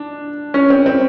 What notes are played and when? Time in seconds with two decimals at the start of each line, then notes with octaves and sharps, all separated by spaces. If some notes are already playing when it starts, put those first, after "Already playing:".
Already playing: D4
0.54 C#4
0.70 C4
0.86 C4